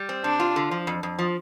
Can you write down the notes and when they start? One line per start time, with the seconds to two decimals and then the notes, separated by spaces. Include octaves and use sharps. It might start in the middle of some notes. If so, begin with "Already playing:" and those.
Already playing: G3
0.09 C4
0.24 C3 D4
0.40 F4
0.56 D3
0.71 F3
0.87 F2
1.03 F2
1.19 F3